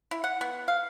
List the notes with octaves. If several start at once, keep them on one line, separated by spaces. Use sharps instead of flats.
E4
F#5
B3
F5